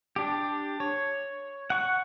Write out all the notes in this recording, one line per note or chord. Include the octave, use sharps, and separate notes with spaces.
D4 G4
C#5
F#5 C#6